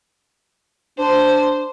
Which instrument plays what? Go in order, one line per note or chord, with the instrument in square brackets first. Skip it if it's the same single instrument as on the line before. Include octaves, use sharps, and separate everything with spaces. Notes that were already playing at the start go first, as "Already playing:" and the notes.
[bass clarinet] D4 [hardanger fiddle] C5